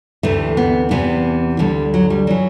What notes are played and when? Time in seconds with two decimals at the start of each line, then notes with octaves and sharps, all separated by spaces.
0.23 D2 C3 E3 A3
0.57 B3
0.91 E2 C3 E3 B3
1.59 D2 D3 G3
1.94 F#3
2.10 G3
2.27 E3 F#3